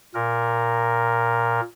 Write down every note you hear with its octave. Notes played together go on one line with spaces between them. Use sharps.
A#2 A#4